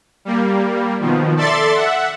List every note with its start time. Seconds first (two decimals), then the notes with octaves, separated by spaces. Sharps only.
0.25 G3 A#3
1.00 B2 D#3 F3
1.36 A4 D5 E5 C6 A6
1.75 E5 F#5